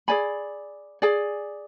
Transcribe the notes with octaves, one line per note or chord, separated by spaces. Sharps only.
G#4 D5 G#5 B5
G#4 D5 G#5